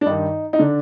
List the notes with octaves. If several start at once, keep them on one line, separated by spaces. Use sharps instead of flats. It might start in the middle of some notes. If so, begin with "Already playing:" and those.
D4
G2 D#3 D#4
D#4
D3 D4